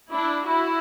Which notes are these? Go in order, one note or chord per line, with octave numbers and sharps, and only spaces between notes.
D4 E4
E4 F#4